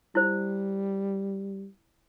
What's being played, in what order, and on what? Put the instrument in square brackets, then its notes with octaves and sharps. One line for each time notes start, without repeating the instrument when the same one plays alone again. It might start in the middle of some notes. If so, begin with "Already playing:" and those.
[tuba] G3 [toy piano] E4 C5